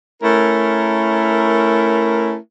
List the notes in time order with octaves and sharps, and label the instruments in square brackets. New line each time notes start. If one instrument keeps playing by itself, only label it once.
[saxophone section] A3 C#4 E4 A#4